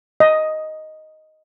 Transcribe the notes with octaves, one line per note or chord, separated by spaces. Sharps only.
D#5